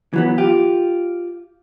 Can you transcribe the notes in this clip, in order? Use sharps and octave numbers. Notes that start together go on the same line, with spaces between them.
E3 F#3 B3
F4 G4